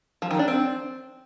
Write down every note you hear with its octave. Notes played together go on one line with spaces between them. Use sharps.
F3
D#3
D4
C4